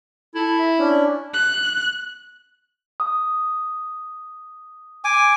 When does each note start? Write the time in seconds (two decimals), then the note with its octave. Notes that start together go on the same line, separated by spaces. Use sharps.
0.35 E4 A4
0.59 E5
0.79 C#4 D4
1.34 F#6
3.00 D#6
5.04 G#5 D6